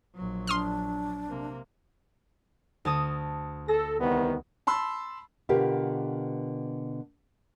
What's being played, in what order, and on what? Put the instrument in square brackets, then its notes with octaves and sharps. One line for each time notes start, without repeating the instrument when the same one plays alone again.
[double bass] A#1 F#3
[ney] D4 [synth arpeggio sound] C6 D#6 F6
[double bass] C3 A#3
[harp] D2 A5 D#6
[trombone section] A4 [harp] A#6
[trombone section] C2 D#3 B3
[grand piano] A5 B5 C6 E6
[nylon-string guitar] B2 D3 F4 G4 A#4 B4